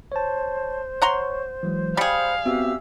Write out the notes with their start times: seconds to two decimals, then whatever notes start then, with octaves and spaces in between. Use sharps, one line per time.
0.12 C5 C#5 A5
1.02 C#5 F#5 A#5 C6 C#6
1.63 E3 F#3 G#3
1.97 G3 G#4 F5 B5 C#7
2.46 B3 C4 F#4 G4 E5 E6